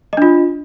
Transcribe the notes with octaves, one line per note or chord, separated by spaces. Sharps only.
D4 F4 D#5